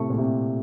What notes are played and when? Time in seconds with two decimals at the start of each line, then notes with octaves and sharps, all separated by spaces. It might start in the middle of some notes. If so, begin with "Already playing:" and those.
Already playing: A2 C3 A3
0.10 A#2
0.18 C3